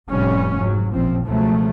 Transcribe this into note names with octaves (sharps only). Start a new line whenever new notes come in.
F1 A2 G3 C#4
G#2 F#3
A1 A#2 F3 C4
C#2 B2 F3 F#3 A3